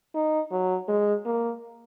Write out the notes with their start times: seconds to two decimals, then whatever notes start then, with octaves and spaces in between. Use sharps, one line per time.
0.15 D#4
0.51 F#3
0.88 G#3
1.26 A#3